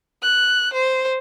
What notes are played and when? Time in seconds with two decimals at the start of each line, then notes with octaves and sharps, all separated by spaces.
0.22 F#6
0.73 C5